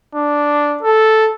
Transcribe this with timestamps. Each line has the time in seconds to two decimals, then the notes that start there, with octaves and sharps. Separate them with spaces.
0.15 D4
0.83 A4